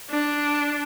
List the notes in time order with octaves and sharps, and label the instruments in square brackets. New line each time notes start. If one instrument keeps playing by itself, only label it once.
[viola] D4